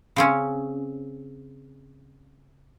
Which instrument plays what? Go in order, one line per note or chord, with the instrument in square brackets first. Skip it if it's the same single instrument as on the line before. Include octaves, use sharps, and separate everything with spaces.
[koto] C#3 C4 C#4